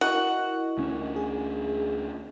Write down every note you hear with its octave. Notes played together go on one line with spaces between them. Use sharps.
E4 F#4 A#4 D#5
D2 C#4
G#4